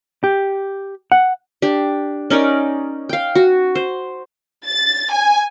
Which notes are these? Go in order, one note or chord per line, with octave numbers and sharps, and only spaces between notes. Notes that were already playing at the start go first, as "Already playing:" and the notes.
G4
F#5
D4 G4
C#4 D#4 A#4 D5
F5 G5
F#4
C5
A6
G#5